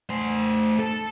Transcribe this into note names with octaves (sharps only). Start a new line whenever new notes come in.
A3 C5
A4